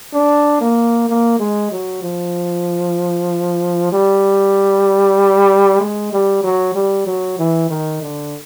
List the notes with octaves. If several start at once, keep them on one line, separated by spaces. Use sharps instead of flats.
D4
A#3
A#3
G#3
F#3
F3
G3
G#3
G3
F#3
G3
F#3
E3
D#3
D3